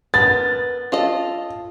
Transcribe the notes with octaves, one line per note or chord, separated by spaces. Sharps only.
B3 A#4 A6
F4 A4 D#5